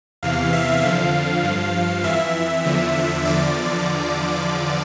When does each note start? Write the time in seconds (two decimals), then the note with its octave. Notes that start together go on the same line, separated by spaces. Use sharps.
0.23 E2 C3 E3 F5
0.53 E5
0.83 F2 D3 F3 F5
1.43 G2 F3
2.04 F2 E3 E5
2.64 E2 D3 F3
3.25 E2 D3 F3 D5